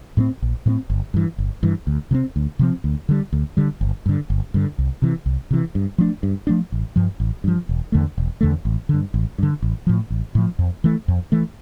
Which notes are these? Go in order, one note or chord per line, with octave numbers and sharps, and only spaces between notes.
A2 G3 C4
A#1
A2 G3 C4
G1
G2 E3
G1
G2 E3
D2
C3 F3 C4
D2
C3 F3 C4
D2
D3 G3
D2
D3 G3
G1
G2 D3
G1
G2 D3
C2
C3 E3
C2
C3 E3
G2
F3 A3 D4
G2
F3 A3 D4
A1
G2 F3
A1
G2 F3
E1
E2 D3 A3
E1
E2 D3 A3
A1
G2 D3
A1
G2 D3
A1
A2 F3
A1
A2 F3
F2
E3 A3
F2
E3 A3